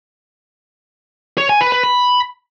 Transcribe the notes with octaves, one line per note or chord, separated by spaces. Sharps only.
C#5
G#5
B4
B4
B5